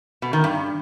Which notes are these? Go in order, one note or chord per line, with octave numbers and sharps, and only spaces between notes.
B2
D#3
G2